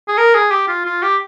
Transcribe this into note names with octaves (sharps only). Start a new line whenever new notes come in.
G#4
A#4
G#4
G4
F4
F4
G4